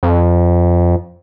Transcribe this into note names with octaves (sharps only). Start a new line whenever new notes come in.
F2